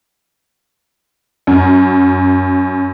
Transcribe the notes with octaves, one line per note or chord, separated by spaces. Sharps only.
F#2